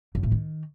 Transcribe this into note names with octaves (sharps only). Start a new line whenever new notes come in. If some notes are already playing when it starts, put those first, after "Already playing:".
F#2
A2
D#3